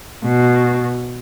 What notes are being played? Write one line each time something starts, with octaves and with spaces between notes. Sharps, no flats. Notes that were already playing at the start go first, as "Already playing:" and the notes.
B2